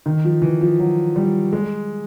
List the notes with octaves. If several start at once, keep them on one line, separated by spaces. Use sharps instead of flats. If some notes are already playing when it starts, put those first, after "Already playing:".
D#3
F3
E3
F3
F#3
G3
G#3